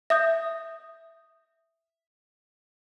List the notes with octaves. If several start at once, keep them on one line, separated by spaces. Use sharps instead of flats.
E5 D#6 G6